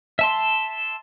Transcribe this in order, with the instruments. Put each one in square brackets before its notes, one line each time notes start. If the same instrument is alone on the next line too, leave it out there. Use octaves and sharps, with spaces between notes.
[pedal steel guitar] E5 A5 C6